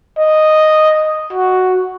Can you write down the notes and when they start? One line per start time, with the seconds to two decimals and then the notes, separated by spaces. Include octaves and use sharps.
0.19 D#5
1.33 F#4